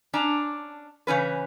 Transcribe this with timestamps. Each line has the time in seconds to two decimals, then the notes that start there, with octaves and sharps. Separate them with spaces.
0.13 C#4 D4 A#5
1.07 C#3 E3 C#4 B4